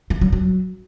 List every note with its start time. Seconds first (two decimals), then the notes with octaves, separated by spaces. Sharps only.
0.10 E3
0.21 F#3
0.32 F#3